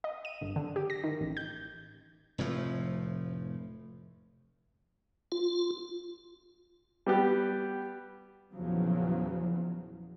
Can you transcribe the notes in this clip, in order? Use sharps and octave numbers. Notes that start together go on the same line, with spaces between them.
D#5
D#7
G1
D3
G4
A#6
D#3
A1
G6
F1 A2 F3 A3
F4
G3 B3 G4
E2 A#2 C#3 F3 F#3